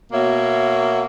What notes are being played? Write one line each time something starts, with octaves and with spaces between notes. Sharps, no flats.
B2 A#3 C#5 E5